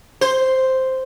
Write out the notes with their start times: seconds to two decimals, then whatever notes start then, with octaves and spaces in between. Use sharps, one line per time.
0.21 C5